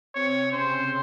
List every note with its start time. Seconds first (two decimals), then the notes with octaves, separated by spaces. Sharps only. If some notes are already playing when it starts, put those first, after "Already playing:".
0.15 C3 C4 C#5
0.52 C#3 C#4 C5